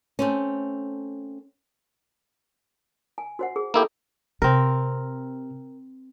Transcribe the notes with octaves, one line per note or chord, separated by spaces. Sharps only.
A3 C4 C#4
G#5
F#4 C5 F#5
G#4
A#3 D#4 E4 G4 A4 E5
C3 C4 A#4